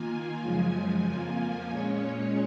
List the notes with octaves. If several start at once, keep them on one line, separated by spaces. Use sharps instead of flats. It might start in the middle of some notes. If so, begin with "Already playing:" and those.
Already playing: D#3 A#3 F4 G#5
F#2 C#3 F3 G#3 G#5
F2 F3 A#3 F4
A#2 G#3 C#4 C#5